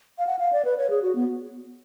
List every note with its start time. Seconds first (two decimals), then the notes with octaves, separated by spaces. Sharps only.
0.18 F5
0.27 F#5
0.39 F5
0.53 D5
0.65 B4
0.77 C#5
0.90 G#4
1.02 F#4
1.15 B3